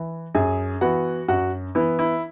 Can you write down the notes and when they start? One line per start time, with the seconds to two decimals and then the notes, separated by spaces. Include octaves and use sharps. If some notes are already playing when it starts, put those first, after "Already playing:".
Already playing: E3
0.35 F#2 G#4 G#5
0.81 E3 B3 F#4 F#5
1.28 F#2 F#4 F#5
1.75 E3 B3 E4
1.99 E4